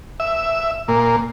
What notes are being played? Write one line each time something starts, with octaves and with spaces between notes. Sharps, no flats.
E5
A#2